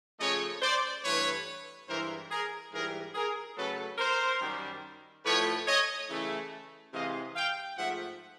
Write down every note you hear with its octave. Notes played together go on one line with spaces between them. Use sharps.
C#3 F3 A3 C#5 D#5
C5 D5
G2 E3 A3 B4 C#5
G2 E3 G#3 A#4 C5
G#4 A#4
G#2 E3 G3 G#4 A#4
G#4 A#4
C#3 F#3 A3 A4 B4
A#4 C5
F#2 D#3 G3
A2 F3 A3 B4 C#5
C#5 D#5
C#3 E3 A3
C3 E3 G#3 D#5 F5
F5 G5
G#2 F3 A3 E5 F#5